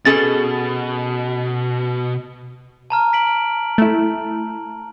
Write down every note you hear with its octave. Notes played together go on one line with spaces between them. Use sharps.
B2 C#4 G#4 A4 A6
A5 A#5 F6
B6 D7 F#7
F#7
A3 E4